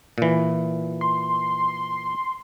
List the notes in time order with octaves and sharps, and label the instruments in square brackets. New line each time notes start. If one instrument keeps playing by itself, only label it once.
[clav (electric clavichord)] A#2 E3
[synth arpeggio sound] C6